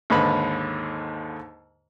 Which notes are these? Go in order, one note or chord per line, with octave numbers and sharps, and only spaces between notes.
D#2 G#2 D3 B4 B5